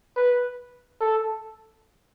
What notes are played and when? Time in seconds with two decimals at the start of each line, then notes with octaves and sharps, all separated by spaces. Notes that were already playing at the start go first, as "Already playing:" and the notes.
0.16 B4
1.01 A4